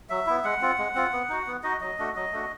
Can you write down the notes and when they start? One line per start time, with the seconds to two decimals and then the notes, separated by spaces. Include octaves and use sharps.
0.10 F#3 E5
0.27 B3 E4
0.44 G#3 F#5
0.61 C4 F4
0.78 G#3
0.95 C4 F4
1.13 B3
1.29 D#4 F#4
1.47 B3
1.63 D#4 F#4 D#5
1.81 F#3 D#5
1.99 A3 D4 F#4
2.15 F#3 D#5
2.32 A3 D4 F#4